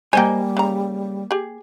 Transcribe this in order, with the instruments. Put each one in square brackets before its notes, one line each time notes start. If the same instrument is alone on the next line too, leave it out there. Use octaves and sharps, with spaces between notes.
[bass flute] G3 [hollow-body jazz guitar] A#3 G#5 [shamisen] C5 D#5 G5
[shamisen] C#3 A#5
G4 G#4